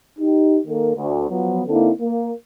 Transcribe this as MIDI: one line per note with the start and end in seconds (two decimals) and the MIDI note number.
0.19 0.58 63
0.19 0.58 67
0.66 0.93 51
0.66 0.93 58
0.66 0.93 69
0.66 0.93 70
0.96 1.26 38
1.29 1.61 53
1.29 1.61 54
1.29 1.61 59
1.67 1.90 50
1.67 1.90 58
1.67 1.90 60
1.67 1.90 63
1.67 1.90 64
1.67 1.90 69
2.00 2.32 58